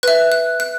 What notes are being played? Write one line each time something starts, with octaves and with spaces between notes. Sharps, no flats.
B4 E5 F#6
F#6
F#6